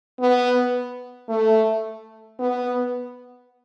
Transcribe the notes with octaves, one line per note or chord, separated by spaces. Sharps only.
B3
A3
B3